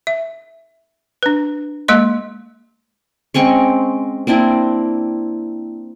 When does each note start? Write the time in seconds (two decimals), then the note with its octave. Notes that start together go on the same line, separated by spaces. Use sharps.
0.07 E5
1.23 D4 B4
1.88 G#3 A#3 D#5 C6
3.34 G#3 C4 C#4 C#6
4.27 A#3 C4 D4 E4